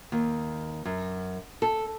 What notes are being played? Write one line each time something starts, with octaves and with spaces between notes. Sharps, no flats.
D#2
F#2
A4